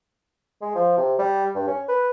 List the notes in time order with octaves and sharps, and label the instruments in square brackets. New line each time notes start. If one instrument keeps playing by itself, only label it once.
[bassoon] G#3
F3
C3
G3
G2
C#4
B4